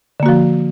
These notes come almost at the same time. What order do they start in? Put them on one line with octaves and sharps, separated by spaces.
D3 A#3 F#4 F3